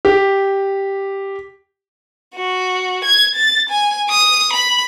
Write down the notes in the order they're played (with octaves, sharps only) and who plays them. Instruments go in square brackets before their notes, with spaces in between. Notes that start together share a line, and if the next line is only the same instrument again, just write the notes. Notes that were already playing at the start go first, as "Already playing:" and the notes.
[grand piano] G4
[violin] F#4
G#6
A6
G#5
D#6
B5